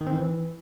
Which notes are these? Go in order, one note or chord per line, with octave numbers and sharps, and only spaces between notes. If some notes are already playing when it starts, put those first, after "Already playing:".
D#3
C4
E3